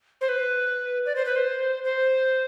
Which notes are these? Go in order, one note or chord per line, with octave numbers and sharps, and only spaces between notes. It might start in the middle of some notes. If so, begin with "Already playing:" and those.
C5
B4
D5
C5
B4
C5
C5